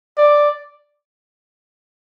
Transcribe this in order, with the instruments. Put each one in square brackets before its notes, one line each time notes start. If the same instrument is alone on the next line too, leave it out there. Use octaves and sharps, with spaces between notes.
[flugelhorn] D5